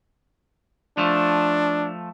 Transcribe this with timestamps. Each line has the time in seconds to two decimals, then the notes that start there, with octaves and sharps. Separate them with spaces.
0.98 F3 A3 D4